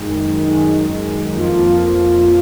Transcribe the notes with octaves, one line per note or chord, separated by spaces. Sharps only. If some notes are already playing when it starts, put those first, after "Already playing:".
Already playing: F#2 D#3 G#3 D#4
F#2 D#3 G#3 D#4
F2 F3 A#3 F4
A#3 F4